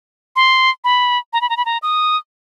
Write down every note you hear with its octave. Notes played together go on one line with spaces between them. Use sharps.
C6
B5
A#5
B5
A#5
B5
A#5
D#6